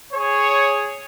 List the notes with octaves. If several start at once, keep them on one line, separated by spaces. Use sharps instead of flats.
G#4 C#5